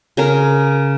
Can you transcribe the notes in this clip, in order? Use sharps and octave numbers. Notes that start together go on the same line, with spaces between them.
C#3 A#4